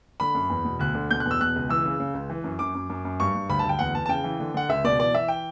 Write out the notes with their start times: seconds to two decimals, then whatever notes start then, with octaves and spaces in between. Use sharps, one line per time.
0.20 D3 B5
0.35 F#2
0.50 E2
0.64 B2
0.79 D2 F#6
0.95 D3
1.10 B2 G6
1.20 F#6
1.26 E2
1.31 E6
1.40 B2 F#6
1.55 C#2
1.69 E3 E6
1.85 C#3
2.00 C#3
2.14 C#2
2.30 E3
2.44 F#2
2.59 F#2 D6
2.75 F#2
2.90 F#2
3.05 F#2
3.20 G2 C#6
3.35 G2
3.49 D2 B5
3.59 A5
3.64 D2
3.69 G5
3.79 E2 F#5
3.95 E2 A5
4.06 A5
4.09 C#3 G5
4.24 E3
4.40 D3
4.54 D3 F#5
4.69 C#2 E5
4.84 B2 D5
4.99 E3 D5
5.14 E3 E5
5.28 G5